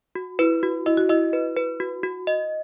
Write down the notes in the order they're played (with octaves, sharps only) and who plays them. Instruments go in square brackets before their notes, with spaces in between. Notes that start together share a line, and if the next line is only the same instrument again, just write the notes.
[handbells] F#4
[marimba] E4 [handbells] B4
[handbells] F#4
[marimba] E4 [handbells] D#5
[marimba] F#4
[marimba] E4 [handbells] D#5
[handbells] B4
B4
F#4
F#4
D#5